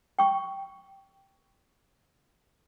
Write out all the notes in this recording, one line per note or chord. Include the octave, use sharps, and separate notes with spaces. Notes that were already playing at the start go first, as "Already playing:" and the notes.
G5 C#6